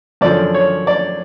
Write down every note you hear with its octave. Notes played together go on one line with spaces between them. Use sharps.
F#2 D3 F3 D5
C#5
D5